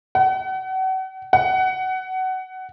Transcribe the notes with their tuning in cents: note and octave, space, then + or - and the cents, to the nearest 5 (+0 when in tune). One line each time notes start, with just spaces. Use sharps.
F#5 +35
F#5 +20